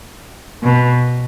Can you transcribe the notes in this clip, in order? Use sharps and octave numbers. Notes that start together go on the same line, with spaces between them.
B2